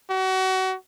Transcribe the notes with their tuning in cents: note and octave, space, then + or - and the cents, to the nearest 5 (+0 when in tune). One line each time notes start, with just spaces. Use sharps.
F#4 +30